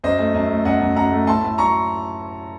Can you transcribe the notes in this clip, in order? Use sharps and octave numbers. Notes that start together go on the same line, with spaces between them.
F#2 C5 D#5
A3
F#2
A3
F#2 D#5 F#5
F#2
F#2 F#5 A#5
A3
A2 A5 C6
A2
F#3 A#5 C#6